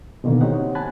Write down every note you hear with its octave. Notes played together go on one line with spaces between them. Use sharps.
B2 D3 D#3 A#3
C4 D#4 G4 C#5 F#5
G#5 A5 B5 F#6